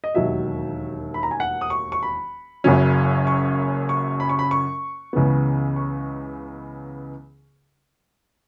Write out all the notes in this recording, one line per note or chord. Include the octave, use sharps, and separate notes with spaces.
D#5
E1 D#2 D#3 F#3 E5
B5
A#5
G#5
F#5
D#6
C#6
C#6
B5
F#1 F#2 C#3 F#3 C#4
C#6
C#6
B5
C#6
B5
C#6
C#2 C#3 E3 B3
C#6